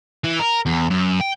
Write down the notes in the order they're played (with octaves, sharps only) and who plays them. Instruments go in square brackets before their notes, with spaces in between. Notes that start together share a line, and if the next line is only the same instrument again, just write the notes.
[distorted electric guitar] E3
A#4
E2
F#2
G5